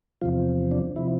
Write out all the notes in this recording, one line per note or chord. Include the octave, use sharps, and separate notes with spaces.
E2 C3 F3 F4
D4
C3 F3 E4